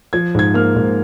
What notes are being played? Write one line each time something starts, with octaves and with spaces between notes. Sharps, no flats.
F3 G#6
G#2 G#6
A#3 F6
G#2